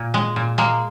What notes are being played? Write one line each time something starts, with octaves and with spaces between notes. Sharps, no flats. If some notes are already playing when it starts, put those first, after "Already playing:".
Already playing: A#2
G#3
A#2
G#3 A#3